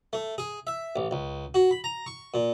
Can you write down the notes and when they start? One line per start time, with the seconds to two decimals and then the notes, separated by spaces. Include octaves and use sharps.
0.13 A3
0.38 G#4
0.67 E5
0.96 A1
1.11 C#2
1.54 F#4
1.71 B5
1.84 A#5
2.06 C#6
2.34 A#2